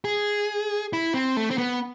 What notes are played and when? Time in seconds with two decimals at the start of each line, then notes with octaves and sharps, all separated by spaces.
0.05 G#4
0.93 E4
1.14 C4
1.37 A3
1.51 C4
1.58 B3